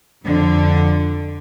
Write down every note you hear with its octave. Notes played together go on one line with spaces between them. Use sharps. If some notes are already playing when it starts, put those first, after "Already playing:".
F2 D3